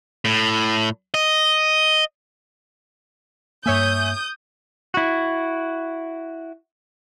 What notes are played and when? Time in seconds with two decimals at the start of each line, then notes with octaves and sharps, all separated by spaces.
0.25 A2
1.14 D#5
3.66 G2 A#3 C#5 E5 G#5 D#6 G6
4.94 E4 F#4